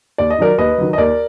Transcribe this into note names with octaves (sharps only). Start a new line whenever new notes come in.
D#2 D5
D#5
D#3 F#3 A#4 D5
D#2 B4 D#5
D#3 F#3
D#5
D#2 A#4 D5